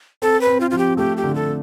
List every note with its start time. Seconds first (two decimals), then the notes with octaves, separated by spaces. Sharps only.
0.22 C4 A4
0.41 B4
0.47 C4
0.60 F4
0.71 F3 F4
0.78 G4
0.97 A3 G4
1.17 G4
1.23 D3
1.35 A4